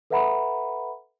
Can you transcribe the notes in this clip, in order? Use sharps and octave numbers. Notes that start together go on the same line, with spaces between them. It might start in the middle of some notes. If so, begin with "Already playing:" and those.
A4 B4 E5 F#5 A#5 B5